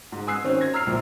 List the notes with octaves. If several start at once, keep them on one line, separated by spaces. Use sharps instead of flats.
G#2
G#5 D#6 E6 F#6 C7
D#3 C4 C#4 D#4
G#6 A#6
A#5 E6 F6 C7 F7
A#1 A#2 F3